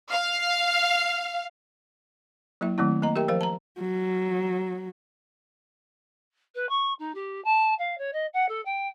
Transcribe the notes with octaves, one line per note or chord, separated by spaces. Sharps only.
F5
F#3 A#3 E4 E5
D#3 F#3 A3 C4 E4
A#3 D#5 A#5
G4 A#4 E5 G5
F3 A#4 C5 F5
A5 A#5
F#3
B4
C#6
D#4
G4
A5
F5
C#5
D#5
F#5
A4
G5